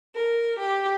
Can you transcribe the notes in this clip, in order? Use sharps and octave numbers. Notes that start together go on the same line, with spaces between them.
A#4
G4